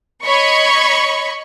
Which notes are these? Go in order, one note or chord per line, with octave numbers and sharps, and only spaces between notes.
C#5 D#5 B5 C#6